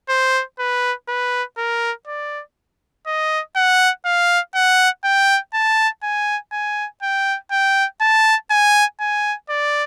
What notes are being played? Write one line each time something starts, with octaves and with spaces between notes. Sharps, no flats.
C5
B4
B4
A#4
D5
D#5
F#5
F5
F#5
G5
A5
G#5
G#5
G5
G5
A5
G#5
G#5
D5